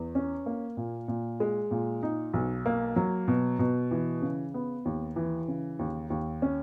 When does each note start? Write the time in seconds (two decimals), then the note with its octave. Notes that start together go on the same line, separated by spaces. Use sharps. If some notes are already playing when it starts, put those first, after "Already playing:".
Already playing: E2
0.15 C#4
0.46 A#3
0.77 A#2
1.08 A#2
1.40 G#3
1.71 A#2
2.03 D#4
2.34 B1
2.66 A#3
2.96 F#3
3.28 B2
3.59 B2
3.91 E3
4.22 C#3
4.54 B3
4.85 D#2
5.16 E3
5.48 C#3
5.79 D#2
6.10 D#2
6.42 C#4